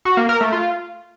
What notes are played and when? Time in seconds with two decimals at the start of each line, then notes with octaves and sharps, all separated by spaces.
0.05 F#4
0.17 A#3
0.29 A#4
0.41 A3
0.52 F4